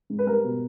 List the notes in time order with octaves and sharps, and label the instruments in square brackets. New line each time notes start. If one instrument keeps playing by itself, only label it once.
[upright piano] G#2
B4
G3 A#4
B2